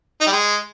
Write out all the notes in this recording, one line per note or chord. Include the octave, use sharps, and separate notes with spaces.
D#4
G3
G#3